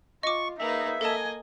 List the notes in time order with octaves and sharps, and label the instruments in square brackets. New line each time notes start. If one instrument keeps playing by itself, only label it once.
[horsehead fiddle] F4 [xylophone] D#5 D6 [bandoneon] C#6
[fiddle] A#3 B4 [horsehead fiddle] D#4 G#4 [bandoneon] E5
[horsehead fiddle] A#3 G#5 [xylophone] A4 A5 [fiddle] D#5